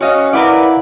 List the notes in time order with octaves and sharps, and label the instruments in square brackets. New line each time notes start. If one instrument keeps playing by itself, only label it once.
[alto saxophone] C#4 [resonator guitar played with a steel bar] F#4 D#5 F5
[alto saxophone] E4 [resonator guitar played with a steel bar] A#4 B4 D5 [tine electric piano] F5 F#5 D6